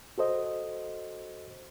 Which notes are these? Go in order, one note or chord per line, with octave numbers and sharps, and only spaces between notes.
F#4 A4 C5 D#5